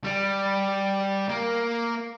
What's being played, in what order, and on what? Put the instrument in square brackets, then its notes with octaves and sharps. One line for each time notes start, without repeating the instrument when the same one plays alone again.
[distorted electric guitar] G3
A#3